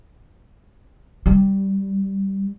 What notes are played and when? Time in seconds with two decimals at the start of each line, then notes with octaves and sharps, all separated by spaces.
1.26 G3